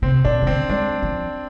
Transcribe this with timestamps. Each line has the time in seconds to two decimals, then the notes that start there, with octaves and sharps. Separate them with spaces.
0.02 C3 C4
0.25 B2 D4
0.42 C3
0.47 D3 C4
0.69 G#3 D4
1.03 F3